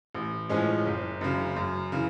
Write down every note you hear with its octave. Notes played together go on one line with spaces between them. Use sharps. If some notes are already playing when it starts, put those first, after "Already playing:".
A1
A2 F3 G#3 C#4
F#1
F#2 C#3
F#2
C#3 E3